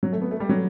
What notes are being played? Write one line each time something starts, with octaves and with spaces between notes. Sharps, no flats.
F#3
A3
B3
A3
G3
F#3